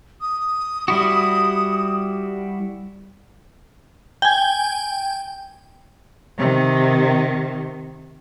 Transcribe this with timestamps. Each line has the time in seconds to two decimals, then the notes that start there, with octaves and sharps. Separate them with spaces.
0.20 D#6
0.88 G3 E4 F#4
4.22 G5 G#5
6.38 C3 D#3